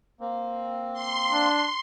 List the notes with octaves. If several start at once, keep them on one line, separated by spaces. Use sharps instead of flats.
A#3 C4
C6
D4